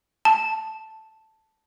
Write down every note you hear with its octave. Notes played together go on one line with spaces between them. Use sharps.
A5